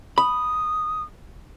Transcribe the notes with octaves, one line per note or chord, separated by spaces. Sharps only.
B5 D#6